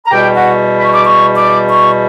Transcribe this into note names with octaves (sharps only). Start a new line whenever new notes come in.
A#5
E2 B2 G3 G4 G5
F#4 F#5
B5
C#5 C#6
D6
C#5 C#6
D5 D6
C#5 C#6